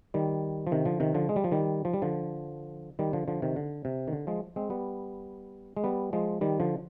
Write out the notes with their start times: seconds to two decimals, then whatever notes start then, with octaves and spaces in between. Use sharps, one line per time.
0.14 D#3 G3
0.67 F3
0.72 C3 D#3
0.85 D3 F3
1.00 C3 D#3
1.14 D3 F3
1.29 G#3
1.36 G3
1.44 F3
1.52 D#3 G3
1.85 F3
1.94 G3
2.02 D3 F3
2.99 D#3 G3
3.13 D3 F3
3.28 D3 F3
3.42 C3 D#3
3.56 D3
3.85 C3
4.08 D#3
4.13 D3
4.27 F3 G#3
4.56 G#3 C4
4.70 G3 B3
5.77 G#3
5.84 G3 B3
6.13 F3 G#3
6.41 D#3 G3
6.60 D3 F3